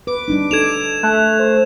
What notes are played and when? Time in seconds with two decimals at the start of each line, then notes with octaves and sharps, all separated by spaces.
0.07 B4 D6
0.28 G3 D4 D#4
0.51 D#4 A4 G#6 E7 F7
1.03 A3 F#6
1.39 C5